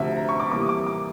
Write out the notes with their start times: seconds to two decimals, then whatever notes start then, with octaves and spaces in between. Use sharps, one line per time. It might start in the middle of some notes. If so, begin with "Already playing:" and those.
Already playing: D2 C3 F3 E5
0.16 A#5
0.29 C#6
0.40 D6
0.51 C3 E3 G3 A#3 D6
0.62 D#6
0.69 D6
0.86 D6